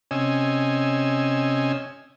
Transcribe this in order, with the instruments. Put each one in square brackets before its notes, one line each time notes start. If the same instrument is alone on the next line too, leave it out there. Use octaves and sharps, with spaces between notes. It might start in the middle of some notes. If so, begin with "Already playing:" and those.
[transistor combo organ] C3 C#4 D#5 G#5 E6